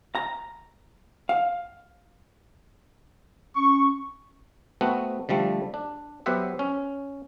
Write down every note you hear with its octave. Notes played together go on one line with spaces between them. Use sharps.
A#5
F5
C#4 C#6
A3 B3 C4 F#4
D3 F3 G3 A3
D4
F#3 B3 G4 C5 E5 F#5
C#4